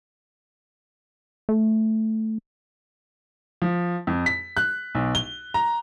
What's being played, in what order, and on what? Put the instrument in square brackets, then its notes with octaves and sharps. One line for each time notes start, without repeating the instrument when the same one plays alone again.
[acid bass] A3
[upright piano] F3
F2
B6
F#6
B1
G7
A#5